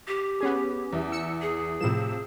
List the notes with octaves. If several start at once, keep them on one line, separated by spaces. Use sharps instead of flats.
G4
B3 C#4 G#4
E2 E5
E6 C#7
G#4
A2 C3 F3 E7